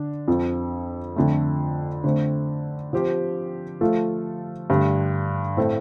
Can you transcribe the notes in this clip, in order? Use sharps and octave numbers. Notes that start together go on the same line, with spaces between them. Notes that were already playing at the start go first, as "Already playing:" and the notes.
Already playing: D3 D4
F2 F3 C4
F2 D3 A3
D3 A3 C4
F3 C4 G4 C5
F3 A3 F4 A4
G2 D3 A3
A2 A3 C4 A4